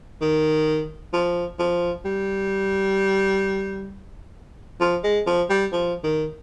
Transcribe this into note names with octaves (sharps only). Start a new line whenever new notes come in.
D#3
F3
F3
G3
F3
G#3
F3
G3
F3
D#3